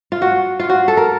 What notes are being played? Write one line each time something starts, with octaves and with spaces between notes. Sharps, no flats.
F4
F#4
F4
F#4
A4
A#4